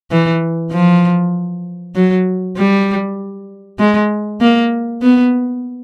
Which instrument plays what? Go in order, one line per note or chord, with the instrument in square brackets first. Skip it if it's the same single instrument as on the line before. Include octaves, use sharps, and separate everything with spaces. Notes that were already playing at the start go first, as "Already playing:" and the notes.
[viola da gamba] E3
F3
F#3
G3
G#3
A#3
B3